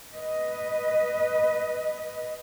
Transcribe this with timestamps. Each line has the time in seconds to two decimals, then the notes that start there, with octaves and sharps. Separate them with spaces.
0.14 B4 D#5